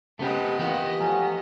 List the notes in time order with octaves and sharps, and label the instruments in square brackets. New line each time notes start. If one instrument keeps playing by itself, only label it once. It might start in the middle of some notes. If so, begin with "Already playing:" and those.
[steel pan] C#3 C4 B4 [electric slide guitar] A3 G4 [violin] B3 D#5
[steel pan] E3 A#3 F4 [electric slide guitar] G4 F#5
[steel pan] F3 A3 [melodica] F#3 C#4